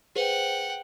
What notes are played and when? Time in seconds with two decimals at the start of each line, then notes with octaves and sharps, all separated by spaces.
0.16 G#4 B4 C5 F#5 G5